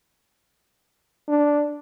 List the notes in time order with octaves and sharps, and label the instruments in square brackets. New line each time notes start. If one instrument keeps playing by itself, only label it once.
[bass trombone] D4